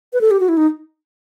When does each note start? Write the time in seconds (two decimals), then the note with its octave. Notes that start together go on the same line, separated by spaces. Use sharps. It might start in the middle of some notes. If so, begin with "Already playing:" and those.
0.13 B4
0.21 A4
0.31 G4
0.40 F#4
0.49 E4
0.57 D#4